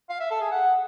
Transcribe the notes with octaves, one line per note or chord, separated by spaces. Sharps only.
F5
E5
A4
G#4
F#5